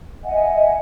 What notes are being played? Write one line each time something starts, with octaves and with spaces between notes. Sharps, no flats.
D#5 E5 F#5 G#5